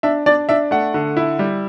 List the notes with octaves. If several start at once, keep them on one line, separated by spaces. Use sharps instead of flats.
D4 E5
D4 D5
D4 E5
A3 F#5
D3
E4
G3